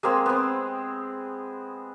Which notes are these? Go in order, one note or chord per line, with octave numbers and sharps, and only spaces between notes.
G#3 A#3 C4 G#4
B3 C4